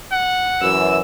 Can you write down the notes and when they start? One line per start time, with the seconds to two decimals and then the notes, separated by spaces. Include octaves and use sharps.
0.12 F#5
0.61 F#2 E3 E6